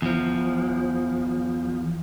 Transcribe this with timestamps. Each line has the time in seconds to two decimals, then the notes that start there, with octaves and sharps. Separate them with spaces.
0.02 E2 F3